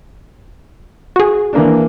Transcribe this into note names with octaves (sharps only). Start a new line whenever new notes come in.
F#4 G#4
E3 A#3 D4